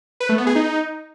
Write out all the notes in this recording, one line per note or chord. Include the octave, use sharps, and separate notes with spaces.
B4
A3
B3
G#4
D#4